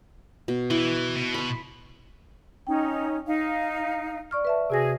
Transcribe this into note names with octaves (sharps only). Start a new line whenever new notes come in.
B2
E3 E4
B2
B5 C6
C#4 D#4 G5
D#4 F5
D5 C#6 F6
B4 E5 A5
C3 F#4 G#4 A#6